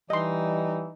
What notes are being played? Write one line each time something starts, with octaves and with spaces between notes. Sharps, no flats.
E3 G3 D#4 D#5 C6